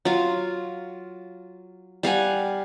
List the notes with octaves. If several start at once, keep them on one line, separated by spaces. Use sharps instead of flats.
F#3 F4
G3 F5 F#5 G#5